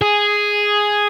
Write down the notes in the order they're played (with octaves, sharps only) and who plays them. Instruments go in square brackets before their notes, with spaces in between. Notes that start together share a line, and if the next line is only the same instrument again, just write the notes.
[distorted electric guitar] G#4